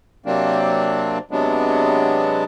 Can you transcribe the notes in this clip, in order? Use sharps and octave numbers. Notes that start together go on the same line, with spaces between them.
C3 F#3 A#3 C4 D4
C3 F#3 G#3 B3 D4